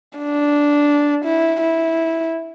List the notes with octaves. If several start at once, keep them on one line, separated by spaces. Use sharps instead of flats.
D4
E4
E4